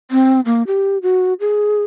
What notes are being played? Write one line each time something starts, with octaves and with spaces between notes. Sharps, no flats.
C4
A#3
G4
F#4
G#4